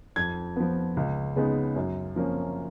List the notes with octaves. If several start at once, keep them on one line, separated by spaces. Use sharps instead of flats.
F2 G#6
F3 B3
C#2
C#3 G#3 B3 D#4
F#2
F3 A#3 C#4